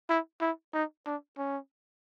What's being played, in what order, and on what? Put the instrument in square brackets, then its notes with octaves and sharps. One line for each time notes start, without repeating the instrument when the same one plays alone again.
[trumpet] E4
E4
D#4
D4
C#4